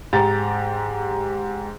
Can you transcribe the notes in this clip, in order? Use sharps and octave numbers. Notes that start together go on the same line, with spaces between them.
G#2 G4 A#5 A6